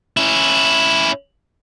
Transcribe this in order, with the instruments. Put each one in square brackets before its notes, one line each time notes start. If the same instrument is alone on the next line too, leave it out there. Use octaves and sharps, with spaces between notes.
[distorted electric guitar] C#4 E4